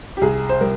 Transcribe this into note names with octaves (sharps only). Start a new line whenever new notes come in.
G4
C2 G#4
C5
G3 A#4